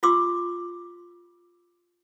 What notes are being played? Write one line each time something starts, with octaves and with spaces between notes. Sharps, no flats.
F4 G4 C6 D6 E6